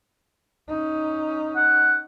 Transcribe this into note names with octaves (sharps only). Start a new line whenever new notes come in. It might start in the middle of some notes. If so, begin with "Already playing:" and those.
C#4 D#4
F#5